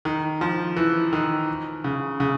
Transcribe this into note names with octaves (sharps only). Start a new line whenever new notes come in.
D#3
F3
E3
D#3
C#3
C#3